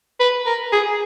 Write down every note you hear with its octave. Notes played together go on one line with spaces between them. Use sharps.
B4
A#4
G#4